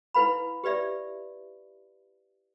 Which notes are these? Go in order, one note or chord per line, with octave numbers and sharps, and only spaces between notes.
E4 B4 F5 B5
G4 B4 D5 E5